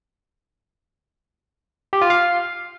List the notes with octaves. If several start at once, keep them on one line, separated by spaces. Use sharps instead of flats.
G4
F4
F5